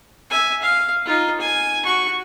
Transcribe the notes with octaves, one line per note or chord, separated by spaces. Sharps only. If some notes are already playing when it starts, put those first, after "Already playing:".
E5 G#5
F5
D#4 F4
G#5
F#4 C#6